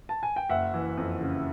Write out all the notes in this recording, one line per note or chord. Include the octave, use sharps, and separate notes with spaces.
A5
G#5
G5
F#1 E5 F#5
E3
F2
C#3